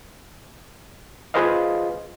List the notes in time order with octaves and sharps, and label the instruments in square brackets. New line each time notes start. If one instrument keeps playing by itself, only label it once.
[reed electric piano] F4 G#4 B4 C5 D#5 F5